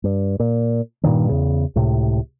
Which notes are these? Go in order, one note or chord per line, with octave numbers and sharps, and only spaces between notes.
G2
A#2
G2 A#2 D#3 E3
E2 C#3
C#2 A2 C3